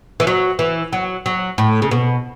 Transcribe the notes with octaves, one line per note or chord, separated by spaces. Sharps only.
E3
F#3
E3
F#3
F#3
A2
C#3
B2